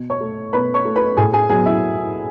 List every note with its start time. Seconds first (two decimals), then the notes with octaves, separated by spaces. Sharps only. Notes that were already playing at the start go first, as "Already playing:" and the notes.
Already playing: B2
0.10 C#5 C#6
0.21 A3
0.53 B2 B4 B5
0.74 C#5 C#6
0.85 A3
0.96 B4 B5
1.17 A2 G#4 G#5
1.33 G#4 G#5
1.49 F#3 G#4 G#5
1.54 B3
1.66 E4 E5